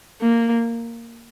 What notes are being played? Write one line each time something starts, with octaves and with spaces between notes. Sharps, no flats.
A#3